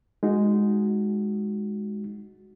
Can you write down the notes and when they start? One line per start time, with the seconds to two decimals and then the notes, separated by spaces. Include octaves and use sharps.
0.23 G#3 D#4 F#4